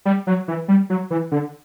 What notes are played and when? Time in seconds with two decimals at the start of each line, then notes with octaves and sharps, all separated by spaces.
0.05 G3
0.27 F#3
0.48 E3
0.68 G3
0.90 F#3
1.10 E3
1.31 D3